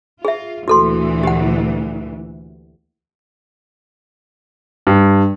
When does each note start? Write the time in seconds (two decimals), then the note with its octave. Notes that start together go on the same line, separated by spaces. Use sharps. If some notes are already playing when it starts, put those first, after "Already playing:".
0.25 F4 G#4 E5
0.68 D2 A#2 E3 F#4 A4 C6
1.24 G4 F#5
4.87 G2